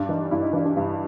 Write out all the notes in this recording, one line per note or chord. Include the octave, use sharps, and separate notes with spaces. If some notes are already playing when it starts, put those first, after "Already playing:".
Already playing: G2 D4
E3 D#4
G2 E4
D#4
E3 D4
D4
G2